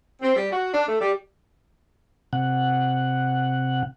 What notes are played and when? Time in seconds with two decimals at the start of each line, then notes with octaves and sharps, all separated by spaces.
0.22 C4
0.36 G3
0.52 F#4
0.73 D4
0.87 A3
1.01 G3
2.33 C3 F#5